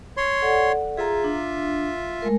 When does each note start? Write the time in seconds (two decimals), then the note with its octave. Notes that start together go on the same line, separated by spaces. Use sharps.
0.17 C#5 C6
0.42 A4 D5 F#5
0.97 F4 G#4 E5 A#5
1.24 D4
2.22 G#3 A3 A#4